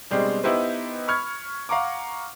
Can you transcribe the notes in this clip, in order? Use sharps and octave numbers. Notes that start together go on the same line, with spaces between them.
B2 G3 G#3 C4 D4
B3 D#4 E4 G4 B4 C5
B5 C#6 F6 G#6
F5 F#5 A#5 C#6 D6